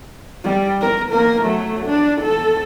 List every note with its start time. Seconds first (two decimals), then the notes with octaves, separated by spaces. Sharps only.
0.44 G3
0.81 A#4
1.11 A#3 A#4
1.42 F#3 A3
1.86 D4
2.21 A4